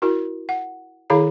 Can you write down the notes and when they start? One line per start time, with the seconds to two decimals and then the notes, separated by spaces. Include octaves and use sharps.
0.02 E4 F#4 A#4
0.49 F#5
1.10 D#3 E4 G#4 C#5 F5 A#5